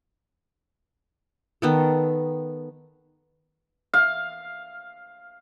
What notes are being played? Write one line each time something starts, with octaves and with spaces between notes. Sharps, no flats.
D#3 B3 A4
F5